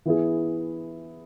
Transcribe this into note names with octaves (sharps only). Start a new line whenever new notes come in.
E3 B3 E4 G#4